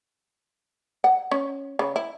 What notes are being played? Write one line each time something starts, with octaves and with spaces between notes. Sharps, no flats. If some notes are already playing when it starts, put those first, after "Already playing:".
F#5
C#4
C#3
E4